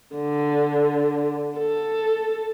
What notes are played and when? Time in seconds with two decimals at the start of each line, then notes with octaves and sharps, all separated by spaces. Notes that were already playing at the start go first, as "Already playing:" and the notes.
0.16 D3
1.58 A4